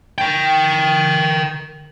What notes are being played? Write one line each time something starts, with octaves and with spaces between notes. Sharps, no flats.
A#4 G5